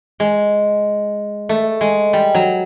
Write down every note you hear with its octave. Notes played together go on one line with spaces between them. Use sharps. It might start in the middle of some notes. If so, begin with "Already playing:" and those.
G#3
A3
G#3
G3
F#3